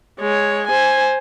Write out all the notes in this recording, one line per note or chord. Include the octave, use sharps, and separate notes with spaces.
G#3 C#5
C5 G#5